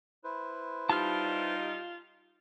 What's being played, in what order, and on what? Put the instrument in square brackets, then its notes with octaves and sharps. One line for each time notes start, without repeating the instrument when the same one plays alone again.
[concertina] E4 B4 C5
[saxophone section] G3 D#4 [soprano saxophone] F4 [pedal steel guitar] A5 F6